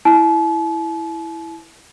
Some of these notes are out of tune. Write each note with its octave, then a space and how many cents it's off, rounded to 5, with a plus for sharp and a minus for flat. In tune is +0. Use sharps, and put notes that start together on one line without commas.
E4 +0 A5 -45